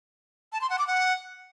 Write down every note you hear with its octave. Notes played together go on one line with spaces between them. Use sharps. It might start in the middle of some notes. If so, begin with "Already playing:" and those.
A5
C6
F#5
D6
F#5